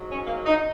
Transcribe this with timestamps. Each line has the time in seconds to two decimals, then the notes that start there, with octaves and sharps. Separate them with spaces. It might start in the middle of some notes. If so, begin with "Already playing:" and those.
Already playing: G#2 F#3
0.08 C#4
0.26 A#3
0.46 D#4